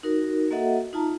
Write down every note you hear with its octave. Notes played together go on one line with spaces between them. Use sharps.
D#4 F#4 A#4
A#3 F#4 A4 D#5 E5 F#5
D#4 F4 A5 A#5